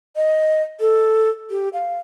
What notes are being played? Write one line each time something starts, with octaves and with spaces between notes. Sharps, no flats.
D#5
A4
G4
F5